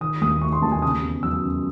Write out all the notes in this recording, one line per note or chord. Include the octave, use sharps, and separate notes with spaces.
D#3 D#6
D#2 D#6
A3 C#6
C6
D#2 A5
G#5
C#3 D#6
E2
F#3 E6
C#4